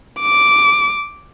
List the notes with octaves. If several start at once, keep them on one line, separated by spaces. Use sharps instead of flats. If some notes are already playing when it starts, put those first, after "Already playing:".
D6